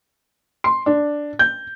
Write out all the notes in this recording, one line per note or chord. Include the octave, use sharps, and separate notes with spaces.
C6
D4
G6